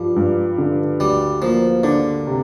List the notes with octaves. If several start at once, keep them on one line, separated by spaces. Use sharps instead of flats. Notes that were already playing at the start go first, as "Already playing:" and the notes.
Already playing: G2 F3 G3
G2
D3
D2 G3
F3 A#3
D3 D4
C3